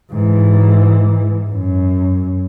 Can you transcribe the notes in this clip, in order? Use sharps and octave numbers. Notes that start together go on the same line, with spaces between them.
G#2 E3
F#2